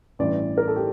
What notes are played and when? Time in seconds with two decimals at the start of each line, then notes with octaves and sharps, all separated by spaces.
0.19 A1 G2 E3 D5
0.58 A#4
0.68 A4
0.76 G4